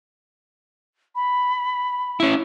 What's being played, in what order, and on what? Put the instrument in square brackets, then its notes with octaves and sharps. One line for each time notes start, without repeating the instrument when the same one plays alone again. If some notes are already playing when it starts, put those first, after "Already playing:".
[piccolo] B5
[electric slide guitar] C#4 E4